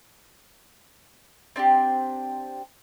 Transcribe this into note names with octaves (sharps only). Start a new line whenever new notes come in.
C4 D4 F4 G4